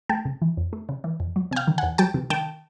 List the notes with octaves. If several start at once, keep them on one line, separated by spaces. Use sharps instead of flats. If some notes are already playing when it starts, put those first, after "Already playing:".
A3 G5 A5
C#3
E3
F2
A3
C#3
E3
F2
F#3
C3 G#5
F5 G5
D#3
E2 F#5 G#5
F#3 G5 A5
C3
D#3 G5 A5